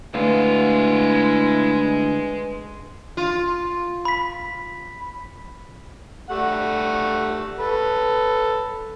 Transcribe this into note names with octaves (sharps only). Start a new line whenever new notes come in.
D2 G#3 E4 B4 F5
F4
B5 B6
G3 A3 F#5
A4 B4